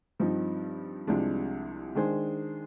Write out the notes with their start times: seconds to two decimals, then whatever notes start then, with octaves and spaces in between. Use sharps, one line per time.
0.19 G2 F3 C4 D#4
1.07 C2 C3 F3 G#3 D4
1.95 D#3 G#3 D4 G#4 C5